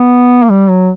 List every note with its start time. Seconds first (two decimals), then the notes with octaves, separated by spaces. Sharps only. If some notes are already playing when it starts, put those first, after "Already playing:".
Already playing: B3
0.43 A#3
0.50 G3
0.70 F#3